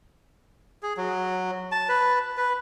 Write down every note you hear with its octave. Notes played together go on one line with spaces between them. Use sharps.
G#4
F#3
A5
B4
B4